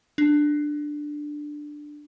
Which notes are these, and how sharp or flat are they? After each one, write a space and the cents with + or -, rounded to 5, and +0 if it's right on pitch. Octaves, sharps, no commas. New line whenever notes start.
D4 +10